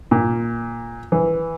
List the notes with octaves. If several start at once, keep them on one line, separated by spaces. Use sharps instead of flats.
A#2
E3